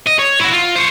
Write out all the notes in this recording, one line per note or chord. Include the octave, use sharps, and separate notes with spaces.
D#5
C#5
E4 F#4
F4
C5 C#5